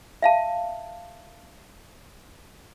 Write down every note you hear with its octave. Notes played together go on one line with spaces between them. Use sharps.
E5 F5 A5